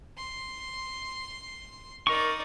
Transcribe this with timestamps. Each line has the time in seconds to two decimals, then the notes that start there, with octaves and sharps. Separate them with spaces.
0.17 C6
2.07 D#4 A#4 D5 C#6